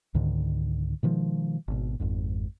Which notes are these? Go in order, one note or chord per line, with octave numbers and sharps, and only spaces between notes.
C#2 G#2 D3 D#3
B2 D#3 F3 G#3
G#1 B2
G#1 F2 G#2